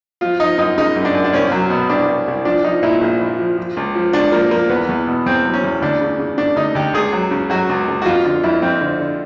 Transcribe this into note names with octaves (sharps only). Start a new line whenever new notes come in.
F3 F4
F3 D#4
F#2 D#4
C#3 D#4
F#2
D4
F#2
D4
C2 C#4
F#3
B2
C2 D4
C2
C2
F3 D4
F3 D#4
A#2 E4
A#1
A#1
F3
F3
C#2
F3
C#2 D4
F3 A#3
F3 A#3
E2 B3
E2
B2
E2 C4
F#3
C#4
E2
D2 D4
C#3
C#3
C#3 D4
D2 D#4
D2 G4
C#2 G#4
F#3
C#3
F#3 F#4
C#2
C#2
F#4
F2 F4
D3 F4
F2 E4
F2 C4
D3
D3